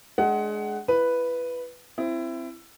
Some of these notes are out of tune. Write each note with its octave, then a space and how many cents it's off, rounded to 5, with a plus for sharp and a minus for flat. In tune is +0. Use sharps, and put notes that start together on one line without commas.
G#3 +20 D4 +0 F#5 +20
E4 +25 B4 +0
C4 +0 E4 +20